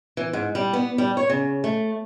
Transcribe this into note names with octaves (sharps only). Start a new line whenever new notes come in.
E3
G#2
G3
B3
G3
C#5
C#3
A3